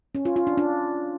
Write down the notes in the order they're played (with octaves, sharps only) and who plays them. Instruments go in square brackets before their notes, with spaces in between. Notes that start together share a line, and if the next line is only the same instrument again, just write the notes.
[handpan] C#4
F4
F4
D4
D4